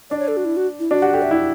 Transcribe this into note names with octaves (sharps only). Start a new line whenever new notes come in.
D4 D5
C#5
A4
F#4
E4
F#4
E4
D4 F#4
F#4 G4
G4 A4
E5
E4